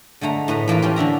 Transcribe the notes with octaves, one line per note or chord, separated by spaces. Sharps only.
D3 G#3 A3 A#5
A2 B4 D#5 A#5
E3 A#3 F4 B4
F3 C#4 F4 G4
D3 D4 E5 A#5